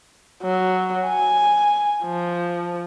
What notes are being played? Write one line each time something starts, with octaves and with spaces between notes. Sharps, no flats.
F#3
G#5
F3